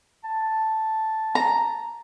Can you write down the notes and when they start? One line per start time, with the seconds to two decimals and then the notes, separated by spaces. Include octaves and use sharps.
0.24 A5
1.35 A#5